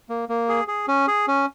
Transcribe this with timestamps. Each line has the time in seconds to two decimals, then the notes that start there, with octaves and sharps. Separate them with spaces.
0.09 A#3
0.29 A#3
0.49 G#4
0.68 G#4
0.88 C#4
1.08 G#4
1.28 C#4